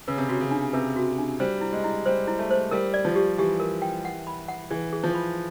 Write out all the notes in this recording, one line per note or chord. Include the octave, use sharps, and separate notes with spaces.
C#3 B4
C3
C#3 F#4
C#3
D4
C3 B4
F#4
D4
G3 C5
E4
G#3
E4
G3 C5
E4
A3
C5
G3 A#4
D5
F3
G4
E3 G4
A#4
G5
F#5
B5
F#5
E3 G#4
G#4
F3
B5